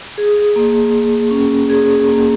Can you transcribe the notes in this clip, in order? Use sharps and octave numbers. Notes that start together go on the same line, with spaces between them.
G#4
A#3
A#3
C#4
G#4
A#3